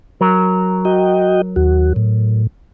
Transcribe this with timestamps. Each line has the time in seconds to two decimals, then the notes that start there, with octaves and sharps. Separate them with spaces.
0.21 F#3 A#4
0.85 F#4 D#5 G5
1.56 D#2 F#4
1.96 A2